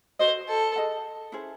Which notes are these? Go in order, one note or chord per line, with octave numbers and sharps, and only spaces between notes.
F#4 A4 C5 D#5
A4
G#4 D#5 F#5
C#4 E4 G#4 C5